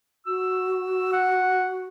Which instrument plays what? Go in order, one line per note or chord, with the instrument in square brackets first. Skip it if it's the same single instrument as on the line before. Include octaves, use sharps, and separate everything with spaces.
[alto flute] F#4 [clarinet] E6
[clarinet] F#5